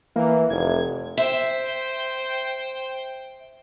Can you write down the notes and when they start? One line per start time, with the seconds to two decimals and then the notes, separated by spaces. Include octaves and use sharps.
0.16 E3 A#3
0.50 F1 G#6
1.17 C5 E5 G5